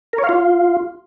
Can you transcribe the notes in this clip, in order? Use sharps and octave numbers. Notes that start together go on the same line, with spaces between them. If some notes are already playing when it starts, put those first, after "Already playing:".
A#4
C#5
F5
F4